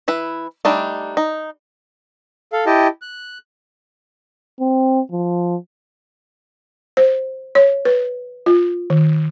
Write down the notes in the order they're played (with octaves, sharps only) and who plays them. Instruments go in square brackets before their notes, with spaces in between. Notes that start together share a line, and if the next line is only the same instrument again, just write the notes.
[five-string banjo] E3 E4 B4
G3 A3 D4 D#4
D#4
[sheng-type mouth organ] A4 F5
E4 G4 D#5 G5 A5
F#6
[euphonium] C4
F3
[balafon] C5
C#5
B4
F4
D#3